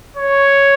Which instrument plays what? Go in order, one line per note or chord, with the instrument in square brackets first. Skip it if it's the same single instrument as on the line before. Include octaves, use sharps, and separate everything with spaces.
[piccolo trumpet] C#5